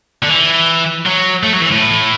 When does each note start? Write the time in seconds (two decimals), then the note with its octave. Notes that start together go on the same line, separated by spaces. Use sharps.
0.23 D3
0.29 E3
1.06 F#3
1.43 A3
1.53 F#3
1.62 E3
1.72 A2